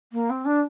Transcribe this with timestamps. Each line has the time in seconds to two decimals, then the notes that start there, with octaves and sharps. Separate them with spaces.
0.12 A#3
0.30 C4
0.45 D4